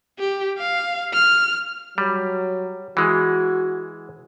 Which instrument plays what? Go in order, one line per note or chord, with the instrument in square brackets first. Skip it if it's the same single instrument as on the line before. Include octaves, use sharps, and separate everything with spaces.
[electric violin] G4
F5
F6
[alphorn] F#3 [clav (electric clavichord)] G3
[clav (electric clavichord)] E3 G#3 [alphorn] F#4